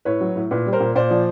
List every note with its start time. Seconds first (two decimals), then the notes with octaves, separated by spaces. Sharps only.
0.05 A2 B4 C#5
0.21 F#3
0.36 A2
0.51 A#2 B4
0.66 G3
0.73 A#4 C5
0.80 A#2
0.95 A#2 C5 D5
1.11 F3